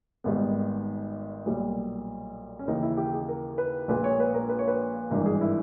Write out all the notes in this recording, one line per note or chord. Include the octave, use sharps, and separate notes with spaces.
G#1 G#2 G3 B3
B1 A#2 G3
C#4
D#2 C#3 E3 D#4
E4
G4
G#4
A#4
B4
A#1 A#2 G#3 B4
C#5
B4
A#4
B4
C#5
B4
G#1 G2 E3 A#4
G#4
E4